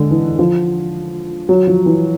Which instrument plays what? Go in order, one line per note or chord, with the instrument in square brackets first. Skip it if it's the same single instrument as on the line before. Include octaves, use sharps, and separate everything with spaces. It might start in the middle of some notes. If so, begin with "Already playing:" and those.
Already playing: [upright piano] D3 G#3
E3
F3
F#3
F3
E3